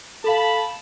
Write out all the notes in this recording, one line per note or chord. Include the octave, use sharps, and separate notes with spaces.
A4 F5 A5 B5